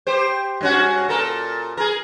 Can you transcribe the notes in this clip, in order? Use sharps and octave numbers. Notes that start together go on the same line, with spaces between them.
G4 C5
G2 C#4 F#4
A#2 A4 A#4
G#4 A#4